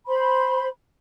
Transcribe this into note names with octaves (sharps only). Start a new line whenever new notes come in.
C5 B5 C6